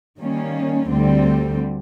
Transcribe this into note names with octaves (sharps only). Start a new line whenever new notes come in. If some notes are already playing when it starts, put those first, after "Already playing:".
D#3 G3 A#3 C#4
D2 D3 G3 C4